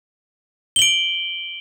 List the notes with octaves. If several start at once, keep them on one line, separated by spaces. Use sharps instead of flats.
D7 F#7 G7